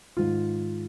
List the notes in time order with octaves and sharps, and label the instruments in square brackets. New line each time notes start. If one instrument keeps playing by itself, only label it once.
[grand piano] G#2 D#3 G#3 F4